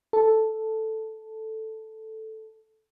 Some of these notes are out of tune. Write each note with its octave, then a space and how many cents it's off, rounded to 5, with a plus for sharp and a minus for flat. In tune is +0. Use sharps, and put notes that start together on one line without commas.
A4 +0